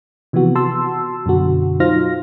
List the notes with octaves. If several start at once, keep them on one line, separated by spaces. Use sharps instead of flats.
C3 E3 F3 B3 F#4
F#4 A5 C6 E6
F#2 B2 D3 F#4
F#3 D#4 F4 C5 F6 A#6